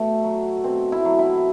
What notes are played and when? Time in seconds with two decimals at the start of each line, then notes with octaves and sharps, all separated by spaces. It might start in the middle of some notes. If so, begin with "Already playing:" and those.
Already playing: B2 A3
0.23 F#3
0.64 B2 C4
0.92 E4
1.05 F#3
1.19 E4